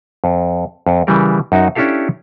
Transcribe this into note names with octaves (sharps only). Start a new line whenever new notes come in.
F2
F2
C#3 E3 G3 A#4
F#2 D#4 F#4
C#4 D4 E4 G4 A4 F5